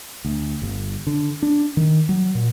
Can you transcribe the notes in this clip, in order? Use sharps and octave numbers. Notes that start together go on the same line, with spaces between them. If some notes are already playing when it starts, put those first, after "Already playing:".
D2
G1
D3
D4
D#3
F#3
A#2